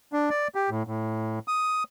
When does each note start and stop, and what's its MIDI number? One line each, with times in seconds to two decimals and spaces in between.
0.13 0.29 62
0.30 0.48 74
0.55 0.70 67
0.70 0.83 45
0.87 1.39 45
1.48 1.83 87